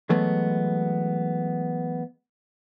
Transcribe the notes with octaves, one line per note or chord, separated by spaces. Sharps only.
E3 F#3 G#3 A3 B3